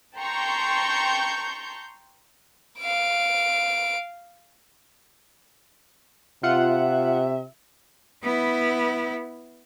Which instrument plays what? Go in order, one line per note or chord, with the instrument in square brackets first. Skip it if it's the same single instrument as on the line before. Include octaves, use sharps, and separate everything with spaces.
[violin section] G5 A5 A#5 C6 C#6 G6
[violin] F5 D7
[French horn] C3 [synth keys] F4 F#5 [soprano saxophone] E5
[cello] B3 E4